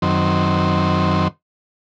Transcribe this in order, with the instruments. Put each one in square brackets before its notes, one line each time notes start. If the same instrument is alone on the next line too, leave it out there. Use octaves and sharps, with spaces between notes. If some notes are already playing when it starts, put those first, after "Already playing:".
[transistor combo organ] F#2 D#3 C4